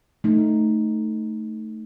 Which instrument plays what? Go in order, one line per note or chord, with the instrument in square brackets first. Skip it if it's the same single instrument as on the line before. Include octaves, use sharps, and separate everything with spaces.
[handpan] A3 D#4